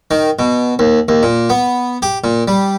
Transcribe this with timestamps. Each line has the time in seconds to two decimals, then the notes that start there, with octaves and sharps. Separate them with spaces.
0.11 D#3
0.39 B2
0.79 D#2
1.08 D#2
1.23 A#2
1.50 B3
2.02 G4
2.24 A#2
2.48 G3